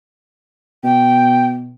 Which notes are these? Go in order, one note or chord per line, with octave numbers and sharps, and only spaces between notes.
B2 G5